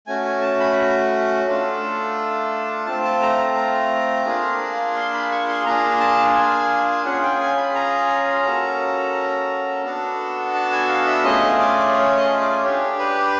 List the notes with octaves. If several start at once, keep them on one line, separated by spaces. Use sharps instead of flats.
A3 C#4 F#4 G#5
G#5
A5
B5
A3 D4 F4 A4
A3 C4 F4 A5
A5
A#5
A#5
A#5
A#3 D4 F4 G#4
C6
B5
C#6
C6
A#3 D4 F4 G#4 A#5
A5
G#5
C#4 F4 G#4 F#5
G5
G#5
B5
A#5
A#3 C#4 F#4 A4
B3 D4 F#4 A4
A5
G#5
F5
E5
A3 C#4 F4 G#4 D#5
D5
C#5
D#5
D5
D4 G4 C#5
B4